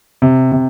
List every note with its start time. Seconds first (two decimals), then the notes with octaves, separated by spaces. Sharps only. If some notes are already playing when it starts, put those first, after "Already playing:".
0.22 C3
0.52 C3